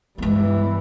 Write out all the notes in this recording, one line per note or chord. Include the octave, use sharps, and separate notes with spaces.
G2 E3 G#3 B3